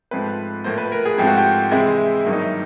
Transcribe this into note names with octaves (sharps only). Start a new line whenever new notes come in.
G#2 F3 A3 C4 B4
A2 F3 A#3 C5
B4
A#4
G#4
G#2 F3 A3 C4 G4
F#4
G4
C3 E3 G#3 C4 E4
G2 D#3 F#3 A#3 E4
D#4
E4